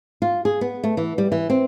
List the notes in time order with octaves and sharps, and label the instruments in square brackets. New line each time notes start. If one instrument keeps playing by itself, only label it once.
[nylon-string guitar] F4
G#4
B3
A3
E3
G3
E3
C4